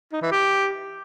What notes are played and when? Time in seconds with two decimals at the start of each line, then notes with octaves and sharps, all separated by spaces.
0.13 D#4
0.22 E3
0.31 G4